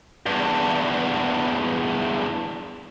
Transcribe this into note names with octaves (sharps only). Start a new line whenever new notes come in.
E2 G2